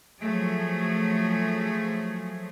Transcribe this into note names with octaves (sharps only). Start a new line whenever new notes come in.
F3 F#3 A3 G#4